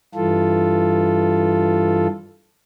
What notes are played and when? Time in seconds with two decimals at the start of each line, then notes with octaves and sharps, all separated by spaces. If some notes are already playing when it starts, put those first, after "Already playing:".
0.15 G2 E3 F4 A4